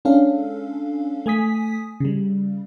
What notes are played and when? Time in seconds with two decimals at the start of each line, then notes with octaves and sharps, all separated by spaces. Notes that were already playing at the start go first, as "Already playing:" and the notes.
0.05 G#3 C#4 D4 A4 F5
1.26 A3 G#5 D#6 B6
2.00 C#3 G3